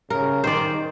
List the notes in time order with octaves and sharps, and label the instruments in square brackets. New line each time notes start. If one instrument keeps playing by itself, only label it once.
[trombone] C#3 [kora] A#4
[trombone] D#3 [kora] C5 D5